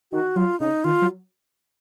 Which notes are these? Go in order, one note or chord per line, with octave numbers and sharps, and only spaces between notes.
D#3 F#4
F#3 F4
C#3 D#4
D#3 F4
F#3